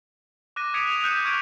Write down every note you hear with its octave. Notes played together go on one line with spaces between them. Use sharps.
D6 F#6 A#6 D#7
D#6 G#6 B6 C#7 D7 F7
D#7 F7
D#6 E6 F#6 G6 C#7 E7
C#6 F6 G#6 D7 D#7